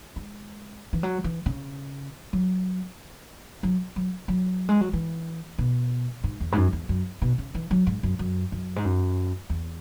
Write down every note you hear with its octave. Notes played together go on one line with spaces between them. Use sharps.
G#3
E3
F#3
E3
C#3
F#3
F#3
F#3
F#3
G#3
F#3
E3
B2
G#2
E2
G#2
F#2
E2
F#2
B2
C#3
E3
F#3
G#2
F#2
F#2
F#2
G#2
F#2
E2